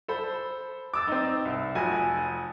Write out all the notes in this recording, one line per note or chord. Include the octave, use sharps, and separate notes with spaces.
A4 C5 B5
D6 E6 A6
C4 D#4
C2
F1 F2 F#4 G#5